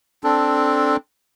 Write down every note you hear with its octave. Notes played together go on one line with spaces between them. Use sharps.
C4 D4 A4